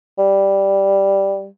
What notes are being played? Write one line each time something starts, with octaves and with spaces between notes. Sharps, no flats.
G3